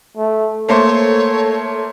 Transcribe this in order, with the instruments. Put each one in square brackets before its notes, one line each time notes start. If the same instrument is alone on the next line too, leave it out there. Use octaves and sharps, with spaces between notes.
[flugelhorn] A3
[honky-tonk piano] A3 A#3 C5 [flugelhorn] A4 [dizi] C#5